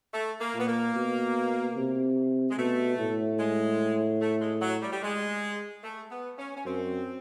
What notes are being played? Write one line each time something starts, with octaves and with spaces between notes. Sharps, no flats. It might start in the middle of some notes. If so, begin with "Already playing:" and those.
A3
A#3
A#2 B3
A#3
B2
C3
G#3
B2 A3
A2
G#3
A3
G#3
F#3
G3
G3
G#3
A3
B3
C#4
C#4
F#2 C4